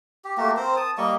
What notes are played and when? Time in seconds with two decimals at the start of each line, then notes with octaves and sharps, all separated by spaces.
0.25 G4
0.37 A3 A#3 F#4 G4
0.57 C4 A#4 C5
0.76 A5 D#6
0.98 G3 A#3 D#5 C#6